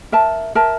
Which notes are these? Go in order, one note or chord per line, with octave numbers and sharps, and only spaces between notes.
A#4 E5 A5
A#4 E5 A5